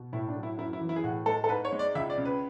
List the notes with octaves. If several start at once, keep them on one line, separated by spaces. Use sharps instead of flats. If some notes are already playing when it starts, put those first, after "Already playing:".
Already playing: B2
A2 E4
D4
F#3
E4
F#2 E4
E4
E3
E4
G#4
A2 F#4
G#3 A4
A4
G#2 B4
C#5
G#3
D5
C#2 E5
D5
C#3
B4